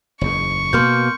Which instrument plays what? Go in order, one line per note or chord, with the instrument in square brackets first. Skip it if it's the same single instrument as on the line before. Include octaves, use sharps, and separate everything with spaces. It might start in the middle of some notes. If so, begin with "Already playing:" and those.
[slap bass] F#1 E2 G#2 [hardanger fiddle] C#6
[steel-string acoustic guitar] B2 A#3 [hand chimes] C6 F6 G6